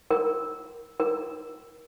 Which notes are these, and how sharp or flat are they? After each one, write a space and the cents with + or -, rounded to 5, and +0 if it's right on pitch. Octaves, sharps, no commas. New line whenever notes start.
A#4 +15
A#4 +30